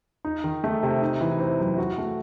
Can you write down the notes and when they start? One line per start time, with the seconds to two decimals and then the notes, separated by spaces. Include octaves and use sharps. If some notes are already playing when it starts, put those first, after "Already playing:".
0.25 D#4
0.44 D#3
0.64 A3
0.83 C3
1.01 D#4
1.21 E3
1.40 C4
1.59 F#2
1.78 F#4
1.98 A3